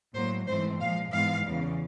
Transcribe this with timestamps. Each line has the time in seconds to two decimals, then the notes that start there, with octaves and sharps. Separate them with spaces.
0.14 A2 F#3 A#3 C5
0.47 G#2 E3 A3 C4 C5
0.80 A#2 F3 G#3 F5
1.12 G#2 E3 G#3 B3 F5
1.44 E2 C#3 E3 G3